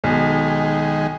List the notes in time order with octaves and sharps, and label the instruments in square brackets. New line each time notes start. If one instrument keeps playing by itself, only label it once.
[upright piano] B1 [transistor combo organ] D#3 G#3